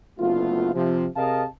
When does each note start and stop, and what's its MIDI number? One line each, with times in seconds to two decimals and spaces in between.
0.19 0.70 30
0.19 0.70 38
0.19 0.70 57
0.19 0.70 59
0.19 0.70 65
0.74 1.06 48
0.74 1.06 53
1.16 1.45 48
1.16 1.45 68
1.16 1.45 70
1.16 1.45 75
1.16 1.45 77
1.16 1.45 81